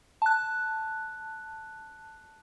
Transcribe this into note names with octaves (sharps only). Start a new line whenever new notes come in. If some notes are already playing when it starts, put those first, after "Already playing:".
A5 F#6